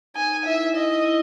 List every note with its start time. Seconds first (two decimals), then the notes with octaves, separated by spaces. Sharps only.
0.16 D#4 G#5
0.46 E4 E5
0.76 E4 D#5
1.06 E4